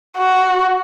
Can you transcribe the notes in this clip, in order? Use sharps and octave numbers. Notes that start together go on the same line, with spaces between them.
F#4